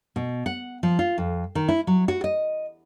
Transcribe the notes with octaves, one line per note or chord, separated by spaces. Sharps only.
B2
F#5
F3
F4
F2
D#3
E4
F#3
F#4
D#5